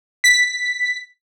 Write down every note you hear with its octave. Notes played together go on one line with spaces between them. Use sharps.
B6